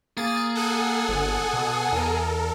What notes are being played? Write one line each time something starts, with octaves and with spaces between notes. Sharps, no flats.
A#3 G#4 A6
A4 F#5 G#5
G1
B2
E2 A4 A#4